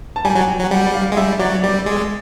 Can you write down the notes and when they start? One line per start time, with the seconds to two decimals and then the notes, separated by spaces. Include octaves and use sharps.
0.16 A5
0.24 G3 G#5
0.36 F#3
0.48 G5
0.59 F#3
0.71 G3 F#5
0.93 F5
1.12 G#3
1.17 G3 E5
1.40 F#3 D5
1.63 G3 D5
1.86 G#3